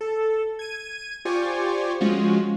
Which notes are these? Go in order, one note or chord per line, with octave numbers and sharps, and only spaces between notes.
A4
G#6 D#7
F4 G4 C5 D5 G#5 C#6
F3 G#3 C#4 F4 F#4